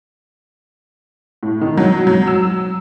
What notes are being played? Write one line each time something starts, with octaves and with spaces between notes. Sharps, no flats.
A2
D#3
F#3
F#3
E6